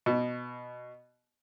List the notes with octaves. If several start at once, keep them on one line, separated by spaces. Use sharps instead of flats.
B2